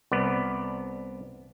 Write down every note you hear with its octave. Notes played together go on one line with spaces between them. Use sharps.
C2 B3 D5